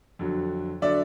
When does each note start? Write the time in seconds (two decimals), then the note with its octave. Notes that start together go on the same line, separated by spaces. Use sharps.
0.19 F2 D3 F#3
0.82 D3 F#3 D5 E5